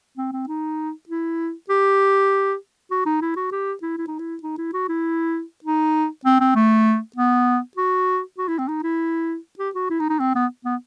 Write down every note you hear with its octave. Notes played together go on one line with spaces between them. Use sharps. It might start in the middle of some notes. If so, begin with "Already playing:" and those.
C4
C4
D#4
E4
G4
F#4
D#4
E4
F#4
G4
E4
E4
D#4
E4
D#4
E4
F#4
E4
D#4
C4
C4
A3
B3
F#4
F#4
E4
C4
D#4
E4
G4
F#4
E4
D#4
D#4
C4
B3
B3